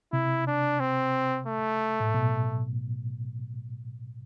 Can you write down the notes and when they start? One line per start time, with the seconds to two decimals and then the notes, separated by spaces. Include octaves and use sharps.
0.13 C3 E4
0.47 D4
0.80 C4
1.47 A3
2.00 A2
2.14 B2